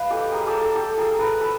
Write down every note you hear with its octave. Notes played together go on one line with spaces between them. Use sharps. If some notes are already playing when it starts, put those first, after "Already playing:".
Already playing: B4 D#5 F5
G4 A4
G#4 A#4
G4 A4
G4 A4
G4 A4
G#4 A#4
A4 B4
A4 B4